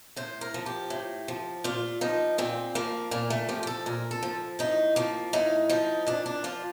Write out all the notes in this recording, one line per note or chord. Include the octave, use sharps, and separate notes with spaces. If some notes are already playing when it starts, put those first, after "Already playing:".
A2 C5
A#4
F3
G4
A2
F3
A#2 F4
F3 D#4
A#2 C4
F3 A#3
A#2 A#3
A3
F3 G4
G4
A4
A#2 A#4
A4
F3
A2 D#4
F3 A#3
A2 D#4
F3 D#4
A#2 D4
D4
F3 F4